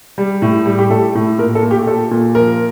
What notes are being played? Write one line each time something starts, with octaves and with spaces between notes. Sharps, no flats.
G3
A2
G3
G4
A2 A4
A2
A#2 A#4
A4
A#2
G4
A#2 A4
A#2
F3 A#4